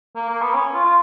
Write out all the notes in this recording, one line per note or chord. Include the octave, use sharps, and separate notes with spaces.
A#3
A#3
B3
C#4
F4
F4